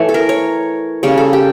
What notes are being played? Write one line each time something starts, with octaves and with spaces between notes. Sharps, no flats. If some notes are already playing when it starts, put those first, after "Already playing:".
Already playing: E3 A3 C#5
A4
A#4
C#5
C#3 G3 A#3 C#5
A4
G4